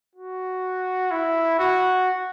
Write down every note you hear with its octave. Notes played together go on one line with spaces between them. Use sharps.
F#4
E4
F#4